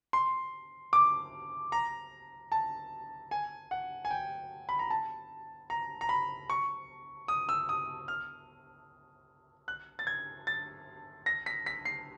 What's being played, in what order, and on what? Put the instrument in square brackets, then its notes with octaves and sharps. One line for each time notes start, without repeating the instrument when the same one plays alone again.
[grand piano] C6
D6
A#5
A5
G#5
F#5
G#5
G5
B5
A#5
A5
A#5
A#5
B5
C#6
D#6
E6
D#6
F6
F#6
A6
G#6
A6
A#6
B6
B6
C7